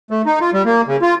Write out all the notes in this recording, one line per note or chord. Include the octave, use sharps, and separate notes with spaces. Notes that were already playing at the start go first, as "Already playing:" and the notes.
A3
D#4
F4
G3
A#3
C#3
F4